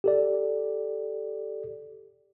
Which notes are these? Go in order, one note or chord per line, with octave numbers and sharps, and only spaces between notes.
G4 A4 D5